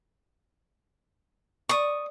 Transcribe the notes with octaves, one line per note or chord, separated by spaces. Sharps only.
D5 C#6 D#6